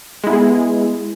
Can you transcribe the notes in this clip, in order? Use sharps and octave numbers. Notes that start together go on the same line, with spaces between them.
G#3 B3 E4 G#4